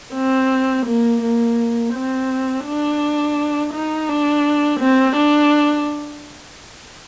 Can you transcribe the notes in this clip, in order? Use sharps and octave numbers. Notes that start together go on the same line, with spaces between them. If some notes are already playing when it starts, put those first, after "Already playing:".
C4
A#3
A#3
C4
D4
D#4
D4
C4
D4